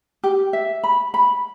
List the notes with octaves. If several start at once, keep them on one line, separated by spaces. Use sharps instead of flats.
G4
E5
B5
B5